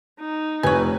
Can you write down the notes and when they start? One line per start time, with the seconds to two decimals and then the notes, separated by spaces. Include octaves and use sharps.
0.20 D#4
0.63 F1 B4 C#5 G#5